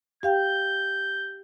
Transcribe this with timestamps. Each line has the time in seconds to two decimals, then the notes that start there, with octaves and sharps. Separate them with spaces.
0.23 G4 F5 G5 G6